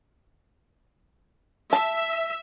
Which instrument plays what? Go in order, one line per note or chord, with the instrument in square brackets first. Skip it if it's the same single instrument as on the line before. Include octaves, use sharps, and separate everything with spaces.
[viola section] E5 [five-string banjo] A5